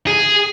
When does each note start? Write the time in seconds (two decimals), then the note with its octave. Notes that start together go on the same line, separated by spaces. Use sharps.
0.07 G#4